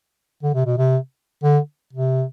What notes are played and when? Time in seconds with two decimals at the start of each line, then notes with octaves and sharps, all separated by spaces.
0.43 D3
0.55 C3
0.66 B2
0.78 C3
1.43 D3
1.93 C3